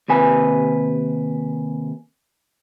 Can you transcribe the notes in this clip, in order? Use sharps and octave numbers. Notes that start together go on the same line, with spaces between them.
D#2 C3 B4 G#5